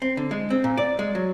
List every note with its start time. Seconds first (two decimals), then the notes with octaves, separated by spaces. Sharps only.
0.02 C4
0.17 D3
0.31 G#3
0.50 C4
0.64 A#2
0.77 D5
0.99 G#3
1.15 F#3